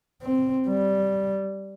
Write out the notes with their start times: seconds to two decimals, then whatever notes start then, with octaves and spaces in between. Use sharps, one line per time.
0.23 C4
0.68 G3